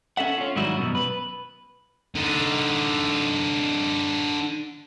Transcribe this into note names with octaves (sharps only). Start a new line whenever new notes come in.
C#4 A4 E5 F#5
C#4 F4
G#2 D#3 F#3 G3 E4 F#4
F#2 B2
B4
D3 D#4